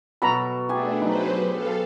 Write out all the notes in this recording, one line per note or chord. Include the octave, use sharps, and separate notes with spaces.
B2 F#3 A4 A#5 B5
A3 D4 G4 G#4 G#5
F#3 D#4 B4 C5
A4 F5